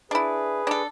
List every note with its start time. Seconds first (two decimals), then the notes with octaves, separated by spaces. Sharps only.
0.11 D4 E4 G#4 B4
0.67 D4 A4